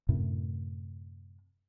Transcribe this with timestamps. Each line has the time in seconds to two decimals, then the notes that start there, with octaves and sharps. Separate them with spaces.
0.09 F#2 A2 C3